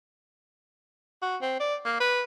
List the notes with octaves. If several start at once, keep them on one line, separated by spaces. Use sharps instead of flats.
F#4
C4
D5
A#3
B4